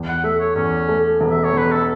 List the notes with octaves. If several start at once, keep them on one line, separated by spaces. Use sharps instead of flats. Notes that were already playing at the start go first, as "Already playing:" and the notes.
Already playing: E2
F#5
A3 E5
C#5
E2 C#4
A3
E1
E5
C#5
E1 B4
A4